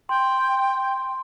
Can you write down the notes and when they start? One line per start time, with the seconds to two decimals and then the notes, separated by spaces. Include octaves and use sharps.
0.09 G5 C6